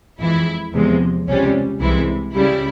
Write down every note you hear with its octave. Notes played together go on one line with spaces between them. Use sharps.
F2 E3 G#3 E4
E2 C3 F3 G#3
C#2 C3 G3 C#4
C2 C3 E3 G#3 E4
C#2 C#3 G3 E4